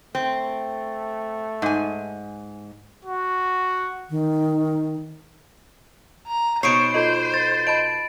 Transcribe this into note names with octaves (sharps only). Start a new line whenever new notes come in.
A3 C4
G#2 G#5
F#4
D#3
A#5
B2 D#4 C5 C#5 C7 D7
F4 A4 C5 D#5
A6
D#5 A5 B5 D7